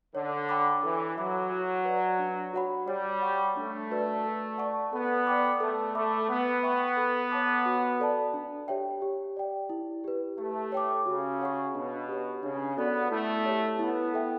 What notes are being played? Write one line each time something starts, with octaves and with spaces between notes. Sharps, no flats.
D3 C#5
G5 B5 D6
E3 A4
F#3 E5 B5 D6
F#4
B4 D5
D4
F#4 C#5 F#5 B5
G3 C#5
F#5 C#6
A3 D4
F#4 B4 D5
A4
D5 F#5 A5 C#6
B3 A4
D5 G5 D6
A3 A4
A3 E5 B5 D6
B3 B4
E5 G5 C#6
A4
C#5 F#5 A5 D6
F#4
A4 D5 A5
D4
G4 C#5 E5 G5
G4
D5 G5
E4
G4 B4
A3 G4
C#5 G5 D6
C#3 F#4
C#5 F#5 C#6
B2 D4
G4 C#5
C#3 D4
B3 F#4 A4 D5
A3 E4
G4 C#5
B3 E4
A4 E5 G5